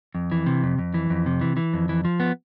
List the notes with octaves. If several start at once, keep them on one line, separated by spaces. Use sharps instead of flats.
F2
E3
C3
F2
F2
E3
F2
C3
E3
E3
F2
E3
F3
B3